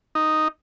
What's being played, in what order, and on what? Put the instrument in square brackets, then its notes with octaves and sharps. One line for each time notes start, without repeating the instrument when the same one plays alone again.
[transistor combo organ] D#4